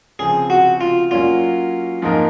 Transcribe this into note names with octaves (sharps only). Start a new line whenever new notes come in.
C#3 F3 C4 G#4
F#4
F4
F#3 A#3 C#4 F4
G#2 F3 A#3 D#4 A#4